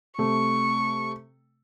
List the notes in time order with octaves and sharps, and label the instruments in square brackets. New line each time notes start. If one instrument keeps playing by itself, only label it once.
[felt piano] C3 A3 [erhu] C#6